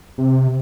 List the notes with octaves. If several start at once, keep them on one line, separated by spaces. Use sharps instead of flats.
C3